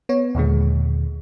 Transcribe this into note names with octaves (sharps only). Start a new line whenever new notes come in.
B3 C#5
D#2 A#2 D3 G#3